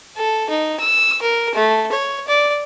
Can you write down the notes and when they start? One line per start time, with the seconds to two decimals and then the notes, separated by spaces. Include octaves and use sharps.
0.16 A4
0.49 D#4
0.80 E6
1.22 A#4
1.55 A3
1.92 C#5
2.27 D5